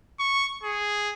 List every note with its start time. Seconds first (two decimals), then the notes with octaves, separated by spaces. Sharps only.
0.20 C#6
0.63 G#4